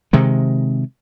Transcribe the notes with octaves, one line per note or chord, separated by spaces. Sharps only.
C3 D#3 G#3